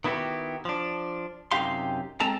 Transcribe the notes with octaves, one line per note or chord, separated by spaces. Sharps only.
D#3 B3 E4 F#4 G4
F3 D4
F#2 C3 D#4 G4 F5 C6
G#3 C4 A4 A5 A#5